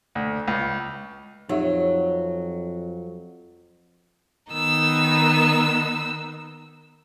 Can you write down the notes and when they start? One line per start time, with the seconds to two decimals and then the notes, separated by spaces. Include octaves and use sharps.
0.15 D2
0.48 C#2
1.49 F2 F#3 D#4 G4 E5
4.50 D#3 B3 D#4 E6